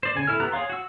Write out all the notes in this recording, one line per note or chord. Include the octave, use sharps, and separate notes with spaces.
C5 D5
C#3 G#5
E4 A4 F6
B3 G4 A#5 F#6
G#4 C#5 F5 C6
F#4 E6